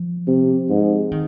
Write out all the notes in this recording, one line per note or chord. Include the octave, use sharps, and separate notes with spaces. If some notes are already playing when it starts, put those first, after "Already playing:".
Already playing: F3
C3
G#2
D#3